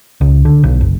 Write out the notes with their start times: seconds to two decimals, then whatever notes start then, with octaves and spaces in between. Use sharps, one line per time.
0.21 C#2
0.45 D3
0.63 B1
0.81 F#1